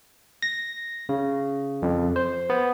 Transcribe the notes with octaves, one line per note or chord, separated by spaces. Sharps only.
A#6
C#3
F2
C5
B3